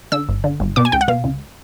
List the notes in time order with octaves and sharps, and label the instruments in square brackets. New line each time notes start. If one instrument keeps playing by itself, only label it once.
[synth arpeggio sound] D3 E6
G1
D3
G1
B2 D6
G#5
C#2 G5
F#5
B2 F5
C#2